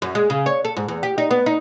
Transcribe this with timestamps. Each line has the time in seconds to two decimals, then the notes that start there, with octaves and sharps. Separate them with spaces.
0.02 F#2
0.15 G#3
0.30 C#3
0.46 C#5
0.65 A4
0.77 G#2
0.88 E2
1.03 G4
1.18 D#4
1.31 B3
1.46 D#4